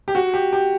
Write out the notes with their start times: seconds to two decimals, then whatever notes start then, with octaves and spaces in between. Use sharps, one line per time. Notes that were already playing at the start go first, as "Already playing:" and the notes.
0.08 G4
0.15 F#4
0.34 G4
0.53 G4